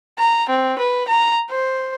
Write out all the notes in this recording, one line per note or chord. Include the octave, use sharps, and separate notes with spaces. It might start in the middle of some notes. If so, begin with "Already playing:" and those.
A#5
C4
B4
A#5
C5